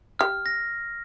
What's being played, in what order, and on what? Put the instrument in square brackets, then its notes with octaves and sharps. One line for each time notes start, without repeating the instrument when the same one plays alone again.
[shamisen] G4 [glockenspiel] F6
[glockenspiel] A#6